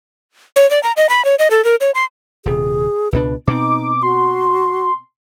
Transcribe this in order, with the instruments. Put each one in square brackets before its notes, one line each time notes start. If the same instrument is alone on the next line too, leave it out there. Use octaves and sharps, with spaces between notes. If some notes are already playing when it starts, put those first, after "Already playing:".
[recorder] C#5
D5
A#5
D#5
B5
C#5
D#5
A4
A#4
C#5
C6
[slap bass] D#1 C3 [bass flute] G#4
[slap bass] C#2 B2 D4 [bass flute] B4
[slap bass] B2 C4 [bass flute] D#4 [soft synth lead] D6
[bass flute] F#4 [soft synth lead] C6